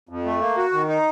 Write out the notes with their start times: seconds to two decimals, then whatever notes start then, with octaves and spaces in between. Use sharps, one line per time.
0.09 F2
0.25 A3
0.41 A#3
0.57 F#4
0.73 D#3
0.88 D#4